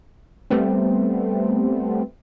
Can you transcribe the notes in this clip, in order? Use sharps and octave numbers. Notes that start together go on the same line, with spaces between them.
G3 A3 B3 C4